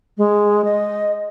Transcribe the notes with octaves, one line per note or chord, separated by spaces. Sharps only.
G#3
D#5